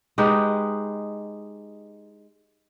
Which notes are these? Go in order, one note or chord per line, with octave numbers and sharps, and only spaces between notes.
G#3 D#4 G4 B4